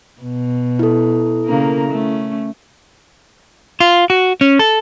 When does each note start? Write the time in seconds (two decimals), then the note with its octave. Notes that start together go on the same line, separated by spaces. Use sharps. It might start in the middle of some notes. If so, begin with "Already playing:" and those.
0.21 B2
0.79 E4 A4
1.46 C#3 A#3 A#4
1.91 A3 C#4
3.80 F4
4.10 F#4
4.41 C#4
4.59 A4